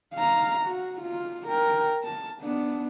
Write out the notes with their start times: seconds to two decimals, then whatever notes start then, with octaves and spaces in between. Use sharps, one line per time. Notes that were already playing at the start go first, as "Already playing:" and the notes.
0.14 F5 A#5
0.66 F#4
1.01 F4
1.47 A#4 G5
2.04 A5
2.41 B3 D4